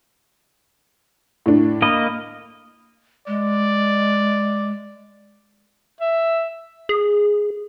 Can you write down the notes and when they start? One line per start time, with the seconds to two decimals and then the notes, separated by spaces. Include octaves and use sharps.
1.46 A2 D4
1.82 A#3 D#5 B5
3.27 G#3 D5
6.00 E5
6.89 G#4